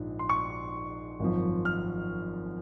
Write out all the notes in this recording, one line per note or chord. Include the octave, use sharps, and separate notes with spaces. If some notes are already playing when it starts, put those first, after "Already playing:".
Already playing: A#1 G#2 F3
C6
C#6
G#1 F#2 F3
F6